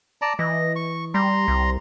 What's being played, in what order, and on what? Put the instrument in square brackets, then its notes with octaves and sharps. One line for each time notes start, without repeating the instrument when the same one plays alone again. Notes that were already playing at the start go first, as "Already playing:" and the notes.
[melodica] D5 A5 A#5
[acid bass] E3 [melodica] D#5
[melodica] C#6
[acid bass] G3 [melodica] A#5 C6
[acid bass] C2